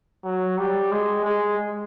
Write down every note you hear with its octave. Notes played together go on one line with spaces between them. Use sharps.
F#3
G3
G#3
G#3